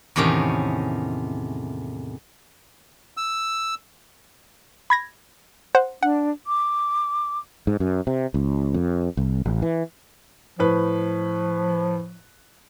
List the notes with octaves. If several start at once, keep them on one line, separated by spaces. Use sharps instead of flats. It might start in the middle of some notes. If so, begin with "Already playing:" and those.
E2 A2 C3 D#3 C#4
E6
B5 G#6 A#6
C5 F#5
D4 F#5
D6
G#2
F#2
C3
C#2
F2
C2
A1
E3
A2 F3 B4